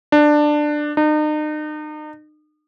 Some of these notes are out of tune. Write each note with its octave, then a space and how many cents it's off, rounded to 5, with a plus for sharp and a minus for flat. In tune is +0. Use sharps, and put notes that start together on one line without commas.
D4 +15
D#4 -40